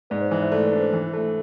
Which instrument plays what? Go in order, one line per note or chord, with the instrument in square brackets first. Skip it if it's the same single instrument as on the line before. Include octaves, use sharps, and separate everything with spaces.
[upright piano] G#2 [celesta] B4 D5
[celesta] C5
[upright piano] E3 [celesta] C5
[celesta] C5 E5
[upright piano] A3 [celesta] B4 D5
[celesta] B4 D5
[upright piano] D4
[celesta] C5
[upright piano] E3
A3